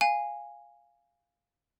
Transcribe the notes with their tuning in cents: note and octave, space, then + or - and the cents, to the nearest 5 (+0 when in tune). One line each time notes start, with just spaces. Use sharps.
F5 +0 G#5 -10